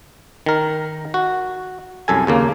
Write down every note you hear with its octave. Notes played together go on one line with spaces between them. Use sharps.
D#3 A#4
F#4
C2 F#2 A4 G#5
D#2 C#3 A#3